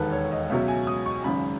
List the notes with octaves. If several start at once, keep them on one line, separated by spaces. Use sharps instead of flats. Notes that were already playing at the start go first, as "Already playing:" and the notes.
Already playing: E1 D#2 D#3 A4 B4
C#5
D#5
C#2 B2 F#3 E5
G#5
D#6
C#6
G#1 F#2 C#3 B5